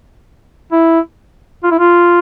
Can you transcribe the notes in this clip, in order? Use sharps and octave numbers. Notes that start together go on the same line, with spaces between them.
E4
F4
E4
F4